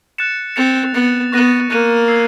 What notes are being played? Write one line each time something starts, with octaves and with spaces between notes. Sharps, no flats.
F#6 A6 C#7 E7
C4 A6 C#7 F7
B3 A6 C#7 F7
B3 C#6 F#6 A#6 D#7
A#3 C#6 F#6 A#6 D#7
E6 G#6 C7